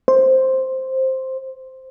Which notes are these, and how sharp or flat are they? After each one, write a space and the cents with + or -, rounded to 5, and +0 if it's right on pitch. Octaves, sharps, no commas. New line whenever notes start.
C5 +5